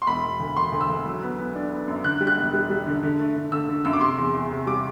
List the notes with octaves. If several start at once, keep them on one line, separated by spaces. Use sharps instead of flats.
C6
E1 B5
E1
D2
E1 C6
D2
E6
D2
F#3
B3
B3
D4
B3
F#2
D3 F#6
G3
F#6
E1
G3
G3
D3
D3
A3
D3
D3 E6
D3
F#2 E6
D6
C3 C6
E2
E2
C3
G3 D6